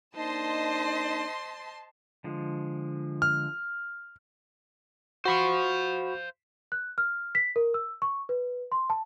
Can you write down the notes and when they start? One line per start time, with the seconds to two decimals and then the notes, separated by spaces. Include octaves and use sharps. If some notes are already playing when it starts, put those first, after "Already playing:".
0.16 A#3 D4 D#4 C5 D#5 A5 C6
2.24 D3 F3 G#3
3.22 F6
5.25 F#4 C5 F5 B5 C#6
6.72 F#6
6.98 F6
7.35 B6
7.56 A#4
7.74 E6
8.02 C#6
8.29 B4
8.72 C6
8.90 A5